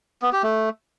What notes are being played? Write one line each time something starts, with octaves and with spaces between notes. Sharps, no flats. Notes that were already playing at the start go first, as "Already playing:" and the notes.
B3
G4
A3